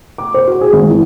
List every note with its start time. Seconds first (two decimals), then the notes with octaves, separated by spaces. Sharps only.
0.18 D6
0.34 C5
0.47 F#4
0.61 G#4
0.73 G#1
0.89 E3